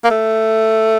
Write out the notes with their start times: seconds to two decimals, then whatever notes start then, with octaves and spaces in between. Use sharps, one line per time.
0.05 A#3
0.11 A3